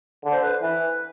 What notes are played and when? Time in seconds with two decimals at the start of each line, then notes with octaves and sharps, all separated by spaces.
0.24 D3
0.32 C5
0.42 B4
0.62 E3 B4